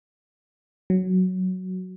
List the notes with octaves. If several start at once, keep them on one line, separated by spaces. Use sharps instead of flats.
F#3